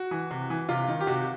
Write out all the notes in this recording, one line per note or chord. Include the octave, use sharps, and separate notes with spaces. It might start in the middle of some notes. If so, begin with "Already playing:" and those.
Already playing: F#4
E3
C3
E3
C3 F4
D#3
G4
C3 F#4